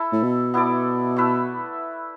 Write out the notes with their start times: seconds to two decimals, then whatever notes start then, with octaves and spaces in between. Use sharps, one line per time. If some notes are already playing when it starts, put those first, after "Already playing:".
Already playing: E4 A4 E5
0.12 A2
0.23 B2
0.54 B3 E4 A4 D5
1.16 A3 E4 B4 E5